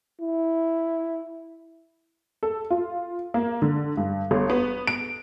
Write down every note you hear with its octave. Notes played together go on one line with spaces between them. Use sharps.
E4
A4
F4
A#3
D3
G2
G1
B3
D7